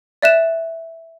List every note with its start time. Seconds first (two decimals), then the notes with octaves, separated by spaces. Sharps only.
0.22 D5 E5 F#6 E7